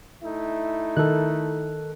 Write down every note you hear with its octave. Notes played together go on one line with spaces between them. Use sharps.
A3 D#4 E4
D#3 A4 F#6